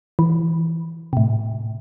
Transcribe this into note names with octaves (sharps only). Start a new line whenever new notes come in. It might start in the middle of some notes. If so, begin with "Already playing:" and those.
E3
A2 C3